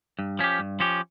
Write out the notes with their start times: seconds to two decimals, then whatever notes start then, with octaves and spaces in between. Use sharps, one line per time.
0.19 G2
0.39 F3 C#4 G4
0.59 G2
0.80 F3 C#4 G4